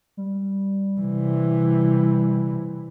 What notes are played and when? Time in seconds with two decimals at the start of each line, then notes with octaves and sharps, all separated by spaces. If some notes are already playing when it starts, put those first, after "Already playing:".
0.17 G3
1.00 C3 E3